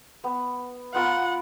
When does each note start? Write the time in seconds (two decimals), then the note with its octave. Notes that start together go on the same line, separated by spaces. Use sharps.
0.24 B3
0.94 B3 F4 A#4 F#5